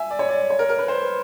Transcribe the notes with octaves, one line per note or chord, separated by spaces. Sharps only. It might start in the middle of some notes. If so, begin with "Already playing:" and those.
Already playing: E5 G#5
D5
C#5
D5
C#5
A#4
A#4
B4
C5